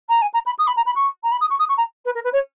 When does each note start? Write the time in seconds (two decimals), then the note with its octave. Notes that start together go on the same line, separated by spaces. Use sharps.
0.09 A#5
0.21 G#5
0.33 A#5
0.46 B5
0.58 D#6
0.67 B5
0.76 A#5
0.86 B5
0.95 C#6
1.23 A#5
1.31 B5
1.41 D#6
1.50 C#6
1.59 D#6
1.68 C#6
1.77 A#5
2.05 B4
2.14 A#4
2.24 B4
2.33 C#5